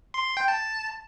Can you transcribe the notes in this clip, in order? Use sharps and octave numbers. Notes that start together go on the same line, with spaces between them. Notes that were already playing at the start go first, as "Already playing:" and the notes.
C6
C6
G5
A5